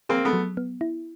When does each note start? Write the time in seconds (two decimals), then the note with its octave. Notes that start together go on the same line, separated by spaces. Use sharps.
0.09 A#3 C4 G#4
0.25 A3 B3
0.33 F#3
0.57 B3
0.81 E4